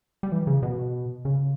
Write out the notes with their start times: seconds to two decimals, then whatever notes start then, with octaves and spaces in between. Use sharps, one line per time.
0.23 G3
0.32 E3
0.47 C#3
0.62 B2
1.25 C#3